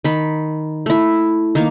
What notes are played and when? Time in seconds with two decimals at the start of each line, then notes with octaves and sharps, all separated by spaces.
0.05 D#3 B5
0.86 A3 E4
1.55 D#3 A#3